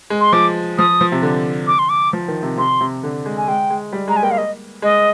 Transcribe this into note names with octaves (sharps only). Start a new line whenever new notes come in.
G#3
C6
F3 D6
F3 D#6
F3
C3
D3
D6
C6
D6
F3
D#3
C3
C3 C6
C3
D3
G#3
G#5
G#3 G5
G#3
G3
G#3 A#5
G#5
A#3 G5
F5
D#5
G#3 D#5